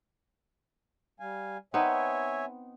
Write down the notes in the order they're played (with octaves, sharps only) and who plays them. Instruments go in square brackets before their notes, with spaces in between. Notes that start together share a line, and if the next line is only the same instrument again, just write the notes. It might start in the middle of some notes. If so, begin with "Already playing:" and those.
[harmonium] G3 F5 G#5
[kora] B3 C4 D#4 [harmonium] C#5 E5 G#5